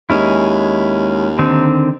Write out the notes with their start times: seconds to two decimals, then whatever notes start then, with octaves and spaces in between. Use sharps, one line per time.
0.10 D#2 G#3 C#4 E4
1.39 D3 D#3 C4